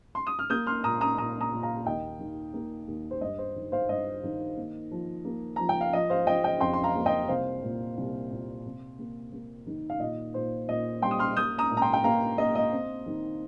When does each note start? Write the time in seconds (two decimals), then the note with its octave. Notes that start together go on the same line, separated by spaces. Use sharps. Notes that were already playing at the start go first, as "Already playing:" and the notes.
0.15 C6
0.27 D#6
0.39 F6
0.50 A#3 D#6 G6
0.67 C6 F6
0.84 A#2 A#5 D#6
1.01 A#5 D#6
1.18 A#2 A#5 D#6
1.40 A#5 D#6
1.52 A#2
1.63 F5 A#5
1.86 D#2 D#5 G5
2.19 D#3
2.54 A#3
2.88 D#2
3.11 C5
3.21 G2 D#5
3.38 C5
3.56 D#3
3.72 C5 F5
3.89 G2 D#5
4.24 D#3
4.57 A#3
4.91 F3
5.25 A#3
5.56 F3 A#5
5.69 G5
5.81 F5
5.93 F3 D#5
6.10 C5 F5
6.27 F3 D#5 G5
6.44 D#5 G5
6.60 F2 G5 C6
6.73 C6
6.84 F5 A#5
6.95 A#3
7.06 D#5 G5
7.28 C2 C5 F5
7.63 A#2
7.97 C2
8.31 A#2
8.65 C3
8.99 A#3
9.32 A#3
9.66 D#3
9.90 F5
10.00 A#2 D#5
10.34 A#2 C5
10.68 A#2 D#5
11.02 G3 G5 C6
11.11 D#6
11.19 C6 F6
11.36 A#3 D#6 G6
11.58 A#5 D#6
11.70 A#2
11.77 A#5
11.82 G5 C6
11.93 G5
12.04 A#3 F5 A#5
12.38 A#3 D#5
12.55 D#5
12.72 C4
13.06 D#3